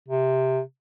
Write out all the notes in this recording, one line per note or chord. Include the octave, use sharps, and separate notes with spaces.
C3